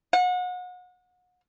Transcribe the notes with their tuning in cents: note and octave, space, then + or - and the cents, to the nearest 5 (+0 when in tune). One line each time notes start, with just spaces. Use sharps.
F#5 -35